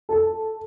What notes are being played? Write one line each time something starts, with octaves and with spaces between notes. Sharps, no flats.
A4